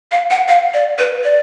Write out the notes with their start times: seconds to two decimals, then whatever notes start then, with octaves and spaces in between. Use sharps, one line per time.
0.12 F5
0.31 F#5
0.48 F5
0.74 D5
0.98 B4
1.24 D5